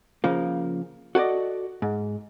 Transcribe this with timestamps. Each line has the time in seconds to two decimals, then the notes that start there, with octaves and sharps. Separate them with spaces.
0.24 C#3 F3 A#3
1.15 F#4 A4 B4 D5 D#5
1.82 G#2